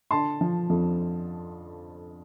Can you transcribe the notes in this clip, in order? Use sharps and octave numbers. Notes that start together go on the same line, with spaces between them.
D3 A5 C6
F3
F2